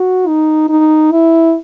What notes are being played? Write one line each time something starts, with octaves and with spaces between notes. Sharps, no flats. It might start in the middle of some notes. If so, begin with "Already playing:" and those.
Already playing: F#4
D#4
D#4
E4